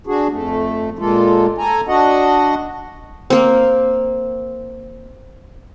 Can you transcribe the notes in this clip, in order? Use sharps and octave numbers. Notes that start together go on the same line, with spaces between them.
D4 F#4 G#4
F2 A3
A#2 G#3 A#3 F4 A4
A4 G#5 A#5
D4 F#4 D#5 F#5
A#3 C4